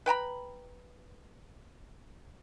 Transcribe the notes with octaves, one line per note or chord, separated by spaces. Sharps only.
B4 G5 A#5 B5